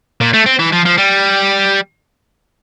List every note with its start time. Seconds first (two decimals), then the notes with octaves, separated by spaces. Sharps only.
0.21 A#2
0.34 A3
0.46 C4
0.59 E3
0.73 F3
0.86 F3
0.98 G3